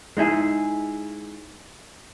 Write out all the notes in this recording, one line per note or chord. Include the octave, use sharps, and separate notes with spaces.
G#3 D#4 E4 G#4